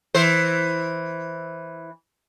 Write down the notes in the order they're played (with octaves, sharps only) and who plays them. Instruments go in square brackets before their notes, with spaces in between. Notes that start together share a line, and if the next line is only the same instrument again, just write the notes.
[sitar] E3 C5